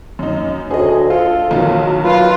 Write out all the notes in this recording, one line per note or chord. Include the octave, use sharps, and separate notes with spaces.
F#2 D#4
D2 G#4 C#5 D#5
F4 A4
B1 D#3 F#3
F4 B4